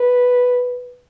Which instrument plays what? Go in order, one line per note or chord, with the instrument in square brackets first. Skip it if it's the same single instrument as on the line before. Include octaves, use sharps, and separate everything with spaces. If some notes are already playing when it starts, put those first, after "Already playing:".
Already playing: [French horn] B4